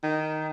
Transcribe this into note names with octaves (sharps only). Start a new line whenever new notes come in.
D#3